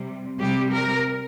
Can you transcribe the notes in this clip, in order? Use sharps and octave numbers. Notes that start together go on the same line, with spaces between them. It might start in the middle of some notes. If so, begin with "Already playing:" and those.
Already playing: C3 G3
C3 G3 G4
A#4